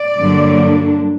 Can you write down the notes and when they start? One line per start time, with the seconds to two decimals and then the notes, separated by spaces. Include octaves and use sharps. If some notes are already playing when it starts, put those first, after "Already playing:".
Already playing: D5
0.18 G2 D3 F#3 A#3 D4